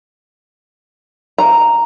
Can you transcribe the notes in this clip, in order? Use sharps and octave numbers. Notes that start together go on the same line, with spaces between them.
A#5